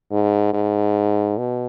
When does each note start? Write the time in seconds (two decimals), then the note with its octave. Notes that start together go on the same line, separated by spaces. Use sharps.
0.12 G#2
0.54 G#2
1.38 B2